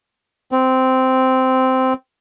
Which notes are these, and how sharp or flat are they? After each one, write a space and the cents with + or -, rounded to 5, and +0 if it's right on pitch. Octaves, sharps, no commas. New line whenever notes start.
C4 -10